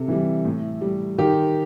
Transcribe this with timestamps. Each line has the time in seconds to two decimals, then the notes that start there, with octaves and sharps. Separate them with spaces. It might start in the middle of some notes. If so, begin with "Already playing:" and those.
Already playing: C3 A4
0.08 E3 G3
0.45 A2
0.81 G3
1.18 D#3 G4